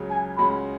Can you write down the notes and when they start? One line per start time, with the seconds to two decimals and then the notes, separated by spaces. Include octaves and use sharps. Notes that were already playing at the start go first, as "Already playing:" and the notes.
Already playing: C#2 C#3 F#3
0.10 G#5
0.38 C#2 C#3 G#3 C#4 F#4 B5